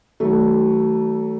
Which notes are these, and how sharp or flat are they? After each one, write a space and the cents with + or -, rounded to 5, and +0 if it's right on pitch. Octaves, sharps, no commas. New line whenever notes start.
D#3 +45 F#3 +35 A3 +0